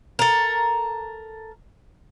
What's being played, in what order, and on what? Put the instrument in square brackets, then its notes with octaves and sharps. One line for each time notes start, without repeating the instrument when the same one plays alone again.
[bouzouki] A4 A#4